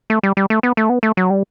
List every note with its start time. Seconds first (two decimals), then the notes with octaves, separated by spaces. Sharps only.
0.10 A3
0.23 G3
0.37 G3
0.50 A3
0.63 B3
0.77 A3
0.90 B3
1.03 A3
1.17 F#3
1.30 G3